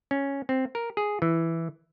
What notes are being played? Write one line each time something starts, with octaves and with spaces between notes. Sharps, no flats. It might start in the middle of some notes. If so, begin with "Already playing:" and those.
C#4
C4
A#4
G#4
E3